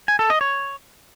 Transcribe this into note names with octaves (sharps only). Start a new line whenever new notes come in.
G#5
A4
D#5
C#5